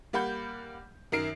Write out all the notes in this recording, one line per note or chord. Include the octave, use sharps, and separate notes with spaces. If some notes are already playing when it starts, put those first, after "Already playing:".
G3 A#3 F#5 B5 G6
F#2 D#3 A#4 C7 D7